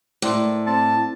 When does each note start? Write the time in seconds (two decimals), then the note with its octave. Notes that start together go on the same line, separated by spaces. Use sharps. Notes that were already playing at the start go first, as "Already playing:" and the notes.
0.22 A2 A#4 C5 D5
0.67 C4 D5 A5